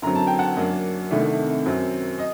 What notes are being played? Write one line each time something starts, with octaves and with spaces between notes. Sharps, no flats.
F#2 D3 F#3 C4 A#5
A5
G5
F#5 A5
F#2 F#3 A#3 D4
C2 C3 D#3 A3 D4
F#2 F#3 C4
D#5